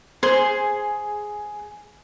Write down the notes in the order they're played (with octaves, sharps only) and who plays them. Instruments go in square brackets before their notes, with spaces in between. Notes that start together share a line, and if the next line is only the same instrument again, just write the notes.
[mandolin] G#4 [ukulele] C5